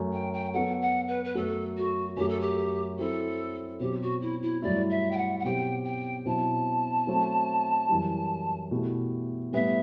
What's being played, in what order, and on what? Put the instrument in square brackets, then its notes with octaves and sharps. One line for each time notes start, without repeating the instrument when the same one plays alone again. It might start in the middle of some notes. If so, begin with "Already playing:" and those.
Already playing: [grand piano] F#2 F#3 A3
[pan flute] G5
G5
[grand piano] F#3 B3 F#4 A4 [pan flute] F#5
[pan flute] F#5
B4
B4
[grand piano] F#2 F#3 A3 [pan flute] A4
[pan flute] F#4
[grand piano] F#2 F#3 A3 [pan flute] G4
[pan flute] A4
G4
[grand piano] F#3 C4 E4 [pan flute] A4
[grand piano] B2 F#3 C4 [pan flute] G4
[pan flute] F#4
E4
E4
[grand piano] G2 F#3 A3 E4 [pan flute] D5
[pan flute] E5
G5
F#5
F#5
[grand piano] B2 F#3 C4 G4 [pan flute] G5
[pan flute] G5
[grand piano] B2 F#3 C4 E4 [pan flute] A5
[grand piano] F#3 A3 C4
F#2 E3 G3
B2 A3 E4 G4
[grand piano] A2 G3 B3 [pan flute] E5